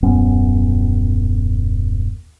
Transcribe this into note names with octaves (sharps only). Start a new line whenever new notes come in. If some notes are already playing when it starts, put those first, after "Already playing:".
D#1 F#2 B3 C#4